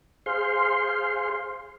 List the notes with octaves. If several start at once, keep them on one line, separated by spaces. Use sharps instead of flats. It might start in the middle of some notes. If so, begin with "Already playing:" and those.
G#4 C5 F5 C6